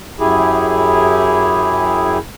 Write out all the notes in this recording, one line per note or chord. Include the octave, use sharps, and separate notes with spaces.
F#2 E4 G4 G#4